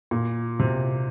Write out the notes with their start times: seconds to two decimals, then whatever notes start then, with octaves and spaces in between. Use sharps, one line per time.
0.11 A#2
0.59 C3